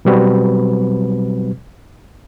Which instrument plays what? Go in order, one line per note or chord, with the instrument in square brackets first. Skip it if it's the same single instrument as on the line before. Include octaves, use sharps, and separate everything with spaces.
[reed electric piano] B2 F#3 G3 C4 F#4 B4